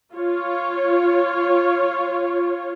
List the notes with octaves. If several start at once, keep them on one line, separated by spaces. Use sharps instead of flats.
F4 C#5